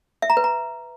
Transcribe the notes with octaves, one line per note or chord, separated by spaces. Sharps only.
E5
A#5
B4
A#5